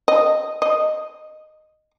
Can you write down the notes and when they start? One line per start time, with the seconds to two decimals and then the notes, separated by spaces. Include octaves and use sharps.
0.08 D#5
0.62 D#5